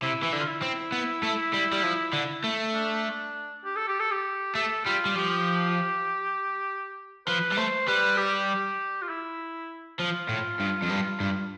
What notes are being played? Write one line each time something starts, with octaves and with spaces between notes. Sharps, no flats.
C3 E4
E3
D3
F4
E4
C4
B3
A3
G3
G3
F3
D3
A3
D4
G4
A4
G4
A4
G4
A3 A4
G3 F4
G3
F3 G4
F3 B4
G3
A3 C5
G3 B4
G4
F4
E4
F3 F4
A2
G2
F2
G2
G2